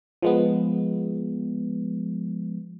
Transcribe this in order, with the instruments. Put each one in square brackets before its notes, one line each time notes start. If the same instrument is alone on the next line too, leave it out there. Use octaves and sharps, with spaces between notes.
[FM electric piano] F3 G#3 B3